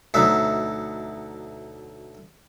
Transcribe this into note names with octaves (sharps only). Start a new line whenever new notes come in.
D2 B2 F#3 D#4 E5